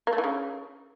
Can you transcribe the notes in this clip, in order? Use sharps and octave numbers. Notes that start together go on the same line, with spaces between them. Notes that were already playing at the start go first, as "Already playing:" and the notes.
A#3
A3
E3
C#3